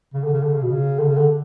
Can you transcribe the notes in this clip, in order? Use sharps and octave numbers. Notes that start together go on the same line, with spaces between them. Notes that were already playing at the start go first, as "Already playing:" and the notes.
C#3
D3
C#3
D3
C#3
B2
C#3
D3
C#3
D3